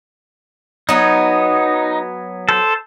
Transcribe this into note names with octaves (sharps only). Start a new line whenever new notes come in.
F#3 B3 D#4
A4 C5